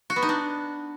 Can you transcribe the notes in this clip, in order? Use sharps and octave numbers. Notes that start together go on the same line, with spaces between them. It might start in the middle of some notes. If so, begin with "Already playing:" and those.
F#4
B3
D#4
D4